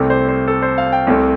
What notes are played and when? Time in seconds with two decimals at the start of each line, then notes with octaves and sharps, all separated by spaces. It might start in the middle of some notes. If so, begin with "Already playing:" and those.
Already playing: C2 C3 A3 C4
0.10 C5
0.28 C5
0.48 A4
0.62 C5
0.78 F5
0.92 G5
1.07 C2 C3 A3 C4